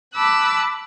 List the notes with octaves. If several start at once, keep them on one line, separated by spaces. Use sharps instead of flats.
A5 B5 D6 E6 F#6